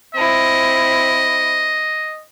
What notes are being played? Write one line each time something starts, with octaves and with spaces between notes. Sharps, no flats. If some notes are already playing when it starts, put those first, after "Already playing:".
C4 E4 D#5